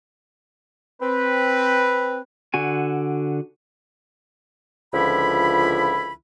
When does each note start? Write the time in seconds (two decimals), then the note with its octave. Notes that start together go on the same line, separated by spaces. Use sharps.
1.01 C4 B4
2.54 D3 F#4 G#5
4.94 C#2 D3 F3 E4 B5